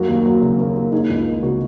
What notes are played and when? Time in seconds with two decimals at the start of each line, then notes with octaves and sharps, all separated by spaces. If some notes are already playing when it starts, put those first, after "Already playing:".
Already playing: F#2 A#3 F#4
0.09 D#2
0.25 F#3
0.41 C#3
0.58 A#3
0.75 D#2
0.92 D#4 G#4
1.09 C#2
1.26 A#3
1.42 C#3 F#4 A#4